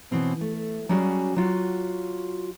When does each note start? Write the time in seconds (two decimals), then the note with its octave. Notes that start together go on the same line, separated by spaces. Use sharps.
0.11 B2 E3 C4 C#4
0.41 A3
0.89 F#3 G3 C#4 F#4 G#4
1.36 F#3 F4 F#4